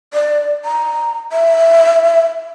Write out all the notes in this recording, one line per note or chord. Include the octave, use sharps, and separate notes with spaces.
D5
A#5
E5